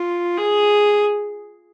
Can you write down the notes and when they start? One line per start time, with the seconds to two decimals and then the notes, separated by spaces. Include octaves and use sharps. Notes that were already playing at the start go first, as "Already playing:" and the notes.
Already playing: F4
0.38 G#4